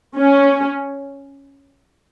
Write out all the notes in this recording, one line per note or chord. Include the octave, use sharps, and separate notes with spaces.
C#4